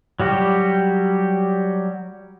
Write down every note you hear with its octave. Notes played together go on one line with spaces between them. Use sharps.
F#3 G3 F#4 G4